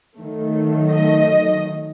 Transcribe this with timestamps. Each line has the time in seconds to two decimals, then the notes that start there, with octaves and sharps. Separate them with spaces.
0.17 D#3 F#3 A3
0.91 D#5